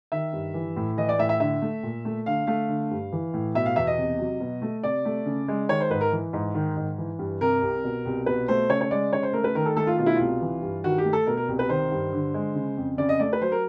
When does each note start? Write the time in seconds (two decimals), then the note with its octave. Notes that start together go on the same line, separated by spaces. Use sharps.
0.12 D#3 E5
0.33 G2
0.54 E3
0.76 A2
0.98 E3 D#5
1.09 D5
1.18 A2 E5
1.29 E5
1.40 D3 E5
1.62 A3
1.83 A#2
2.05 A3
2.26 D3 F5
2.47 A3 F5
2.69 D3
2.91 G2
3.12 E3
3.34 A2
3.55 B2 E5
3.66 F5
3.76 E2 E5
3.87 D#5
3.98 C3
4.19 F#3
4.40 B2
4.62 A3
4.83 C3 D5
5.05 A3
5.26 C#3
5.48 G#3
5.69 D#3 C#5
5.81 C5
5.90 G#2 B4
6.01 A#4
6.12 E3
6.33 G#2
6.55 D#3
6.76 G#2
6.98 E3
7.19 G2
7.41 C3 A#4
7.62 C2
7.84 B2
8.05 C2
8.26 B2 B4
8.48 A3 C5
8.69 C#3 C#5
8.81 C#5
8.91 G#3 D5
9.12 C#3 C#5
9.23 C5
9.33 A3 A#4
9.44 B4
9.55 D#3 A#4
9.66 A4
9.76 A3 A4
9.87 F4
9.99 B2 F4
10.06 E4
10.16 C2 F4
10.41 E3
10.62 G2
10.84 D#3 F#4
10.98 G4
11.05 A3
11.13 A4
11.27 B2 A#4
11.37 A#4
11.48 C2
11.59 B4
11.69 D#3 C5
11.92 G2
12.13 D3
12.34 G#3
12.55 C#3
12.77 F2
12.98 C#3 D5
13.09 D#5
13.20 A3 D5
13.33 B4
13.41 F#3 C5
13.52 A#4